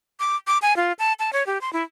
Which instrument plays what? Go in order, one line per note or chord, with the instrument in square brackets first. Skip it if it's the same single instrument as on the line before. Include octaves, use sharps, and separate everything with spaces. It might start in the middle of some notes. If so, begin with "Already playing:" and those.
[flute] D6
D6
G#5
F4
A5
A5
C#5
G4
C6
E4